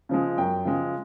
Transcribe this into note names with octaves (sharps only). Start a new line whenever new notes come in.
C#3 F3 G#3
F#2 G5
C#3 F3 G#3